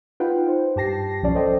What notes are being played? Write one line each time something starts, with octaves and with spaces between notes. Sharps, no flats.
D#4 F4 B4 F#5 G5
C5
G2 G4 A5 A#6 C7
B1 F3 C#4 D5 A5
A4 C5 D5 D#5 G5